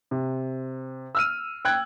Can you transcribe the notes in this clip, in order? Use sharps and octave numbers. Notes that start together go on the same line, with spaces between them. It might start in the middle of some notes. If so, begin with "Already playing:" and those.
C3
E6 F6 D#7
G5 F#6 G#6